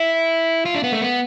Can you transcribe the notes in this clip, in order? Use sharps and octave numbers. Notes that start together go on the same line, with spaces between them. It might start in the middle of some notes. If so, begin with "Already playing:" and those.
Already playing: E4
F4
D4
B3
A3
B3